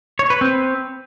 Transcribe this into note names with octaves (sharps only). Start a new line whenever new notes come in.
C#5
B4
C4